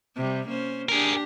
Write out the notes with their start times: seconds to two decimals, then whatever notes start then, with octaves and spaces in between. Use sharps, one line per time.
0.16 C3 G3
0.48 A#3 C#4 C5
0.89 D4 G4 G#4 A#4